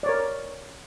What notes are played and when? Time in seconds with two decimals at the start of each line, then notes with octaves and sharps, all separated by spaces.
0.03 D5
0.06 C#5
0.09 A#4